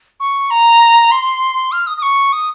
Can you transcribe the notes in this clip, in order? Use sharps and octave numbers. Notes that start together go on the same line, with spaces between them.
C#6
A#5
C6
F6
D#6
D#6
C#6
D#6